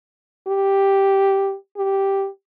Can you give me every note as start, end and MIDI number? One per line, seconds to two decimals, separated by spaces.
0.47 1.55 67
1.77 2.28 67